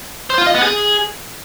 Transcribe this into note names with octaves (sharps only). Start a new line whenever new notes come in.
C5
F4
D#5
B3
G#4